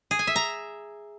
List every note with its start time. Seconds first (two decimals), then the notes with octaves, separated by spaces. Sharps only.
0.11 G#4
0.19 G#5
0.27 E5
0.36 A#5